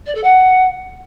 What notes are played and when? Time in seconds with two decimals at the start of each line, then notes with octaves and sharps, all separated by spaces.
0.06 D5
0.14 A4
0.23 F#5